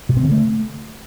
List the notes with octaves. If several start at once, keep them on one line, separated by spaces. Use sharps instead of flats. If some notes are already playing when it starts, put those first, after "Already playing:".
C3
C4
D3
A3